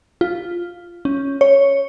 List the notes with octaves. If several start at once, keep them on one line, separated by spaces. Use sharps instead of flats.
F4
C#4
C#5